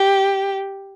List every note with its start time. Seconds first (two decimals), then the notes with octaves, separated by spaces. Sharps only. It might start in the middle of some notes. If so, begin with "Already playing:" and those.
Already playing: G4